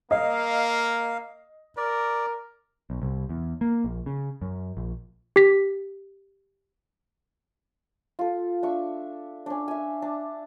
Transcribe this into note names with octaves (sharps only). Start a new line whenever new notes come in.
A#3 D#5 F5
A#4 D5
B1
C2
E2
A#3
A#1
C#3
F#2
A#1
G4 B6
F4 A4
D4 E5 C#6
C#4 D4
E5 G#5
D4 A5